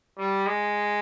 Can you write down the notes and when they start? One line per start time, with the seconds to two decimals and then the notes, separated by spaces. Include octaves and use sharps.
0.18 G3
0.46 G#3